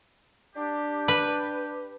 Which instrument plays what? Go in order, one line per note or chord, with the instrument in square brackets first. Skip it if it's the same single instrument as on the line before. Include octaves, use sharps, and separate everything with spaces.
[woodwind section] D4 G4
[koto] B4